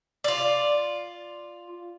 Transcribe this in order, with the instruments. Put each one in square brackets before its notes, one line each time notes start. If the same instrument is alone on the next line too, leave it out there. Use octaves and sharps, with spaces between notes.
[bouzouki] F4 D5